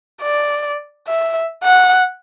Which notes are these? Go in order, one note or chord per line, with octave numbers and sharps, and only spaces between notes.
D5
E5
F#5